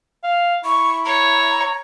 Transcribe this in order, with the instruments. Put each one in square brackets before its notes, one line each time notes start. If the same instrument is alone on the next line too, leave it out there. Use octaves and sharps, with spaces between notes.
[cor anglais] F5
[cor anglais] E4 [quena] C#6
[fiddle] C#5 [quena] A#5